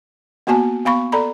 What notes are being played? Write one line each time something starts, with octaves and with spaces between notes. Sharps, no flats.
A#3 B3 F#4 G#5 A5
B3 F5 B5 C#6
A4 D5 A#5 B5